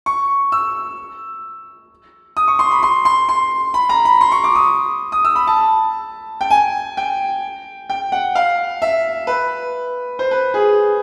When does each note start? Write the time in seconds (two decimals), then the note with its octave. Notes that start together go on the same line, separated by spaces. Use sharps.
0.06 C#6
0.52 E6
2.37 D#6
2.48 C#6
2.59 C6
2.71 B5
2.83 C6
3.05 C6
3.29 C6
3.74 B5
3.89 A#5
4.05 B5
4.21 C6
4.32 C#6
4.44 D6
4.55 D#6
5.12 D#6
5.25 E6
5.36 B5
5.47 A5
6.41 G5
6.50 G#5
6.97 G5
7.90 G5
8.12 F#5
8.35 F5
8.82 E5
9.27 B4
10.19 C5
10.31 B4
10.54 G#4